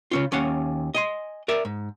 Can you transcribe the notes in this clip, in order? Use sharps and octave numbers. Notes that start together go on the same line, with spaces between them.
C#3 C#4 F4
D#2 C#4 F5 F#5
D#5 G#5 C6
A#4 D5 E5
G#2